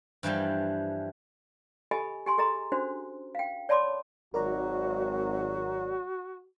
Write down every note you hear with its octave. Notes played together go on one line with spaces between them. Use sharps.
G2 E3 F3 G3
G4 A4 D#5 G#5 B5
G4 G#5 C6
G#4 A4 D#5 A#5 C6
C#4 D4 F#4 C5
F5 G5
C#5 D5 A5 B5 C6 D6
G#1 F#3 F#4 A#4 D5 A#5